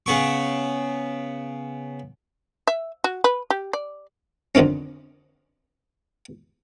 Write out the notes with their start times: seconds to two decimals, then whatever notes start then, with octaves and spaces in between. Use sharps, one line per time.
0.06 C#3 B3 C#6
2.67 E5
3.04 F#4
3.24 B4
3.50 G4
3.73 D5
4.55 F2 D3 D#3 C4 C#4